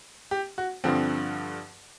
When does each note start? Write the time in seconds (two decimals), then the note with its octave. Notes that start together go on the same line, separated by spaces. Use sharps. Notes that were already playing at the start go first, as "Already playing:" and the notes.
0.31 G4
0.58 F#4
0.84 G2 D3 F3 C4